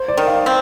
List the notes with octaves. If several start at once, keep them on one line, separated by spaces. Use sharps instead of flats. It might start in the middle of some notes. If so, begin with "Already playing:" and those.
Already playing: C5
D5
D#3
F5
C4